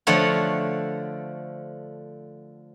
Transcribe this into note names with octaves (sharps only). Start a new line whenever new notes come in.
D3 F3 A3 C#5 F#5